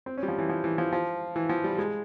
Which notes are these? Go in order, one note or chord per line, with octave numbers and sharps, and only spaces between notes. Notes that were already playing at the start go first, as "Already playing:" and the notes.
C4
C#4
G3
F3
E3
F3
E3
F3
F3
E3
F3
G3
G#3